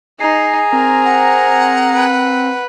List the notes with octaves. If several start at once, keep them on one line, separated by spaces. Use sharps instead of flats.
D#4 G#4 G#5 A#5 C7
C4 A#4
F#5
B4